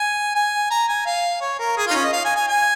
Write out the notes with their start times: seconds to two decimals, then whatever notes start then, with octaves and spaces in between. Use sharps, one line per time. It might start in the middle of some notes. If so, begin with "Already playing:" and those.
Already playing: G#5
0.35 G#5
0.71 A#5
0.88 G#5
1.06 F5
1.41 C#5
1.59 A#4
1.77 G#4
1.87 D#4 F4
1.94 C#4
2.04 D#5
2.13 F5
2.25 G#5
2.36 G#5
2.48 G#5